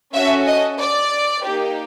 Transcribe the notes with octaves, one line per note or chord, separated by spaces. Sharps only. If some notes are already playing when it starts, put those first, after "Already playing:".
C#4 F#4 A4 E5
D#5
D5
A#3 D#4 G4